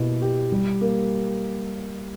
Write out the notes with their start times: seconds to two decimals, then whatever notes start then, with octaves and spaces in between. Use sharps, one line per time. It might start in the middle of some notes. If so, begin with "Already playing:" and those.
Already playing: B2 A#3 E4 G4
0.22 G4
0.52 G3
0.81 A#3